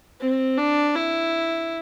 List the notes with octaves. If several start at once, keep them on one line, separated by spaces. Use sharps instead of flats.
C4
D4
E4